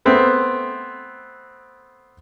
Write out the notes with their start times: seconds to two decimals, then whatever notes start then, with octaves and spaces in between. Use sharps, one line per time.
0.05 A3 B3 C4